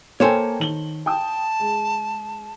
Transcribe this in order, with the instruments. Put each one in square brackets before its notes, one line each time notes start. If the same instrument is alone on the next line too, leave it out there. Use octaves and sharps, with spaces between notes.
[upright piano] A#3 G5 G#5 [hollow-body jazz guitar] A4 C5 C#5
[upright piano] D#3 F#7 G7
[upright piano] G5 D#6 [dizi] A5
[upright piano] G#3